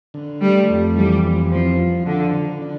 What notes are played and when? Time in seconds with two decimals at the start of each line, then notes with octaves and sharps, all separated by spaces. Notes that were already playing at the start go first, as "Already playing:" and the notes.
0.14 D3
0.41 G3 A3
0.70 F2
0.96 E3 G3
1.24 F2
1.51 F3 C4
1.79 F4
2.07 D3 F3
2.33 D3
2.62 D4